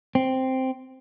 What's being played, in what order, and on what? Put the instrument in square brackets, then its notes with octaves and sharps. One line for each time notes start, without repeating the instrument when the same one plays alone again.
[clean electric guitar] C4